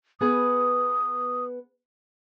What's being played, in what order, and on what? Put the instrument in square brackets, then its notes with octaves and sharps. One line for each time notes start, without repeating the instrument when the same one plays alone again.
[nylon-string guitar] B3 G#4 B4 [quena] D#6